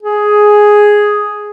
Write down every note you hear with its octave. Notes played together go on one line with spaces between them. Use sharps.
G#4